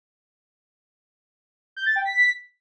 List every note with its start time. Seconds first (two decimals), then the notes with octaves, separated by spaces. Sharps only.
1.77 G6
1.86 A6
1.96 G5
2.05 B6